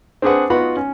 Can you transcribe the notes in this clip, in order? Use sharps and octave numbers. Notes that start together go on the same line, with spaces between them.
C4 D4 G#4 B4 F#5
B3 D#4 F4 F#4 F#5 B5
C#4